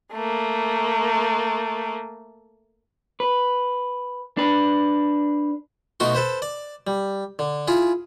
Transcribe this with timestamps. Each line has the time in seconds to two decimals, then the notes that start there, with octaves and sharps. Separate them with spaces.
0.13 A3 A#3
3.20 B4
4.37 D4 B4
6.00 B2 A3 D#4 F#4 C6
6.15 A4 B4 C5
6.42 D5
6.87 G3
7.39 D3
7.68 E4 F4 G#4